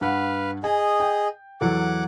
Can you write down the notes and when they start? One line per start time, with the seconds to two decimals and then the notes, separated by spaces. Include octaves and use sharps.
0.01 G2 B4 F5 F#5
0.64 G#4 D#5 G#5
1.00 G5
1.61 E2 F#3 A4 F#5 D6